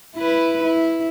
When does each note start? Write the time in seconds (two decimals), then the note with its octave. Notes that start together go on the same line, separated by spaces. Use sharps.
0.16 E4 B4
0.63 E4